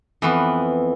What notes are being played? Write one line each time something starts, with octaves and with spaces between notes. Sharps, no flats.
F2 E3 B3